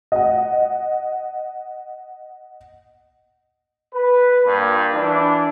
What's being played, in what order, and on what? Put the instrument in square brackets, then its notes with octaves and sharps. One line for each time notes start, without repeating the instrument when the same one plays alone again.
[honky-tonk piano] D#5 F#5
[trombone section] B4
G2 A#2
E3 D4